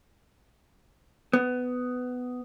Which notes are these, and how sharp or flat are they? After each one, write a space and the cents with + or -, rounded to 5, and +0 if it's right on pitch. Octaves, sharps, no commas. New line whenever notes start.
B3 +15